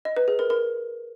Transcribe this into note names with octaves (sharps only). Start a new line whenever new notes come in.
D#5
B4
G#4
A#4
A#4